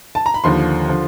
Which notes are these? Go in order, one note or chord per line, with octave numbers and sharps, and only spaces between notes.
A5
A#5
B5
D#2 D3 F3 C6
D3 F3